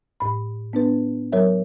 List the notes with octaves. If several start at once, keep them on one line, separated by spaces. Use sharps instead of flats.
A2 B5
B3 D4 B4
F#3 A#4 C#5 E5